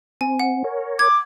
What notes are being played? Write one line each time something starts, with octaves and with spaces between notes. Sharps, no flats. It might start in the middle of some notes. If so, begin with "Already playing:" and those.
C4 G#5
F#5
A#4 C#5
D6 G#6